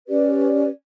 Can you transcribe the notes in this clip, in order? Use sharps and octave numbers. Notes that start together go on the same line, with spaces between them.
C#4 G4 B4 D5